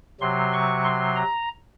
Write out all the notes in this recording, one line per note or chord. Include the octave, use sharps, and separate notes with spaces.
C3 F#3 C6
C#6
C6
A#5